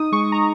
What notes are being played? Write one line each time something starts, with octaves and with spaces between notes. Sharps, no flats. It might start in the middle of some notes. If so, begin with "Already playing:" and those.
Already playing: D#4 D#6
G#3 C#6
A#5